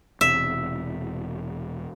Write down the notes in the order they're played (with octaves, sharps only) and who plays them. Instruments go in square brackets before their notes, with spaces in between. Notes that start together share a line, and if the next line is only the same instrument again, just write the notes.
[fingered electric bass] E1 C3 [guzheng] E5